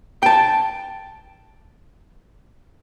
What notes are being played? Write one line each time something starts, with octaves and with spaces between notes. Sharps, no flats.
G5 A5